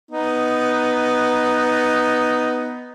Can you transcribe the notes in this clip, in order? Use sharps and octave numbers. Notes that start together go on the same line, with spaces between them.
B3 D#4